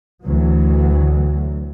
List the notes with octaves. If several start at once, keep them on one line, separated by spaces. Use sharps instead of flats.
D2 E3 F#3